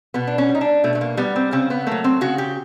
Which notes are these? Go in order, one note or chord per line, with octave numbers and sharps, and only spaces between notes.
B2 B3
D4
C#4
G3
D#4
D4
B2 A3
A3
A#3
G3 B3
C4
C#3 C4
B3
F#3 A3 A#3
C4
C#3 F#4
G4